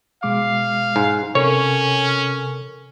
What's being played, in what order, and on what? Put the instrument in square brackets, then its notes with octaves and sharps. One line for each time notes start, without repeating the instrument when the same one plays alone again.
[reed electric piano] B2 G#3 D6 [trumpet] F5
[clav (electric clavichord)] G#2
[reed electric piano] C3 A4 A#4 [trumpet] C#4 [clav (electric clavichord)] C#5